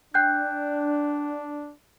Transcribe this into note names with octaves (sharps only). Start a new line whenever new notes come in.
D4 G5 F#6 G6